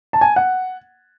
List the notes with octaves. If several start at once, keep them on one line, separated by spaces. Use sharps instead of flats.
A5
G#5
F#5